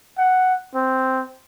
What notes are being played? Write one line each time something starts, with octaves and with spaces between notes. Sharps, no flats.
F#5
C4